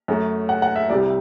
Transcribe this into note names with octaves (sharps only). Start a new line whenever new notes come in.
F#2 F#3 A3
F#5
F#5
E5
C2 C3 G3 D5